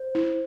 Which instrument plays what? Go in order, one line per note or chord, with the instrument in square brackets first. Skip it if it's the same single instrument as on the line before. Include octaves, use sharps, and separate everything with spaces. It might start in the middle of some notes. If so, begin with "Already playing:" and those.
Already playing: [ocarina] C5
[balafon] E4